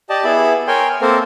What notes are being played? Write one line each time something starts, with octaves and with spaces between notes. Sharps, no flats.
G4 D5 D#5 A5
B3 E4 G#4 E5 B5
A#4 C#5 G5 G#5 C6
A#3 C4 A4 A#4 C5